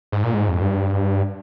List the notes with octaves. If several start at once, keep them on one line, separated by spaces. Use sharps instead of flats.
G#2
A#2
G#2
F2
G2